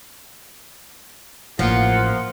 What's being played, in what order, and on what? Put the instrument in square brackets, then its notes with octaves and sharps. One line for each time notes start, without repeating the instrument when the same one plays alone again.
[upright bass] A1 [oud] F3 [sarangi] A#3 [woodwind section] F#5